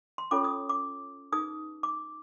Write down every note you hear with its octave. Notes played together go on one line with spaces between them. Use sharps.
C6
C#4 F4 A4 C#5 D6
D#6
D6
D#4 G#4 B4 D#6
D6